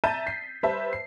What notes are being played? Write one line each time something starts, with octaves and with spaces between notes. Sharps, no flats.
E5 A5 A#5 G6 A6 D#7
B6 C7
G3 B4 C5 E5 A5
C7